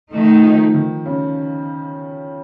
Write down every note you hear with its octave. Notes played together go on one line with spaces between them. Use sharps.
D#3 A3 D#4
F3
D#3
C#3